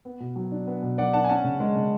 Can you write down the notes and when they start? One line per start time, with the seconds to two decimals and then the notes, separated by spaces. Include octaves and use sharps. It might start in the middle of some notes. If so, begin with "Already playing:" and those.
0.05 B3
0.20 B2
0.36 F#3
0.51 D4
0.67 B3
0.83 B2
0.98 F#3 D5 F#5
1.13 D4 F#5 A5
1.24 G#5
1.29 C#4 F#5 A5
1.44 C#3
1.60 G#3
1.75 C#3